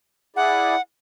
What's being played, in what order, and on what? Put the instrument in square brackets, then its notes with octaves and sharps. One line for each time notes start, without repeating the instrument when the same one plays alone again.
[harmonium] E4 G#4 D5 [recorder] F#5